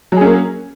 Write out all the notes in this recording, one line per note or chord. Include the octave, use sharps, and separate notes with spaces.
F#3 A#3 C#4 G#4